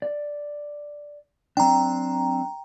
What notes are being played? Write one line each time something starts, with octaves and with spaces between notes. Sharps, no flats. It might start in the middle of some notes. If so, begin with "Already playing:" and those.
D5
F#3 C4 D4 G5 A#5